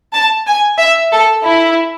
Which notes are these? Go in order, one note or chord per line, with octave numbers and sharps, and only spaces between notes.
A5
G#5
E5
A4
E4